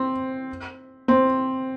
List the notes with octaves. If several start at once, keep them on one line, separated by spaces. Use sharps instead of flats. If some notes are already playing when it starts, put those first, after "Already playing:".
Already playing: C4
C4